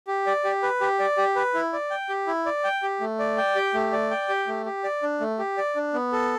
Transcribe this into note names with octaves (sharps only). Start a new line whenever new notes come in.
G4
D5
G4
B4
G4
D5
G4
B4
E4
D5
G5
G4
E4
D5
G5
G4
A3
D5
G5
G4
A3
D5
G5
G4
A3
G4
D5
D4
A3
G4
D5
D4
B3
A4